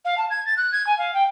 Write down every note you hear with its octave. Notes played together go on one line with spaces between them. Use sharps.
F5
A5
G#6
A6
F#6
G#6
G#5
F5
G5